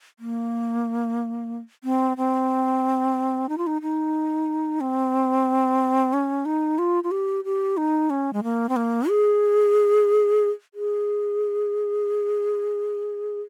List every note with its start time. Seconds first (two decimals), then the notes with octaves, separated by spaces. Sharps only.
0.19 A#3
1.84 C4
2.17 C4
3.49 D#4
3.58 F4
3.67 D#4
3.82 D#4
4.81 C4
6.13 C#4
6.45 D#4
6.78 F4
7.04 F4
7.11 G4
7.44 G4
7.77 D#4
8.10 C#4
8.33 G#3
8.43 A#3
8.69 C4
8.76 A#3
9.09 G#4
10.74 G#4